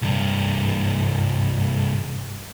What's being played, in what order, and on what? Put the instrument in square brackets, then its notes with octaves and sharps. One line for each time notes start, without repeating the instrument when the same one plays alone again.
[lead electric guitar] C2 G2